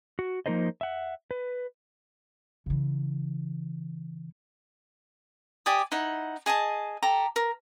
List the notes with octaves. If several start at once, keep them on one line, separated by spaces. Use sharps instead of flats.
F#4
F3 A#3 D#4 A#4 C5 D#5
E5 F#5
B4
C#3 E3
G4 D5 G#5 D#6
D#4 E4 F#5
G#4 D#5 G#5 A5
G4 A4 A#5
A#4